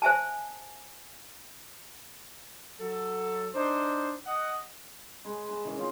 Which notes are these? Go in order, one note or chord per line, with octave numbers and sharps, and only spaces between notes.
C5 E5 G#5 A5
F#3 A4
D4 D#4 C5
D#5 F#5
G#3 G#4 B4
B4 A5 C#6
D#3 E3 G#3 C#4
C4 D#4 F4 C5